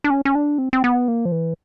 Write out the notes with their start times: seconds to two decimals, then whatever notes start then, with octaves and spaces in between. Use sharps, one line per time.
0.04 D4
0.10 C#4
0.25 C#4
0.35 D4
0.58 C4
0.73 C4
0.84 B3
1.08 A#3
1.25 F3
1.32 E3